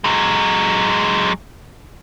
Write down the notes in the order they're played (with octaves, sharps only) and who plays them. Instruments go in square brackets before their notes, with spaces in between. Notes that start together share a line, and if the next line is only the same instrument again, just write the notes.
[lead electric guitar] F#3 G#3